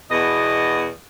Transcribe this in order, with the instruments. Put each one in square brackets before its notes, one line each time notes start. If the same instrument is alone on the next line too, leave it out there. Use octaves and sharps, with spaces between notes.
[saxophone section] E2 B2 D#5